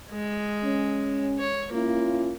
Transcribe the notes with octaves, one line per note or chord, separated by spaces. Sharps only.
G#3
C#4
C#5
A#3 C#4 E4 F4